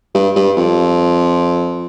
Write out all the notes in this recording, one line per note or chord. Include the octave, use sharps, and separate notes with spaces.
G2
G2
F2